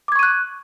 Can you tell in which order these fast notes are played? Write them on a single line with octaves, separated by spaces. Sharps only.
D6 G#6 C#6 D#7 F#6